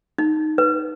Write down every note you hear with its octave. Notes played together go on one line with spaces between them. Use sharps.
D#4
B4